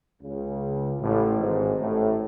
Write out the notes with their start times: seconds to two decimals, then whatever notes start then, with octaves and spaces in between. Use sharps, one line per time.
0.23 C#2 C#3
1.01 A1 A2
1.40 G#1 G#2
1.80 A1 A2